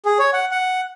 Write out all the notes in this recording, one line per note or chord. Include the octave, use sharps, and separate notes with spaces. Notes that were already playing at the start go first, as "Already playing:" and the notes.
G#4
C#5
F#5
F#5